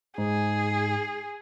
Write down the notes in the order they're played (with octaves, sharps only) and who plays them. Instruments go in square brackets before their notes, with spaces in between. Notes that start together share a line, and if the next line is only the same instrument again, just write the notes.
[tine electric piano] G#2 D#4 [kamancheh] G#4